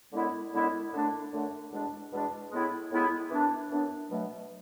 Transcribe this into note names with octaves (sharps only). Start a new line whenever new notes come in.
F#2 D3 G#3 B3 E4
F#2 D3 G#3 B3 E4
F#2 D3 A3 D4
F#2 D3 A3 D4
E2 B2 G#3 D4
E2 B2 G#3 D4
A2 G#3 B3 E4
A2 G#3 B3 E4
F#2 E3 B3 D4
F#2 E3 B3 D4
B2 F#3 A3